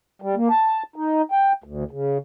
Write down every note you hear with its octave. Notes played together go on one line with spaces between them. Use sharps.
G3
A#3
A5
D#4
G5
D2
C#3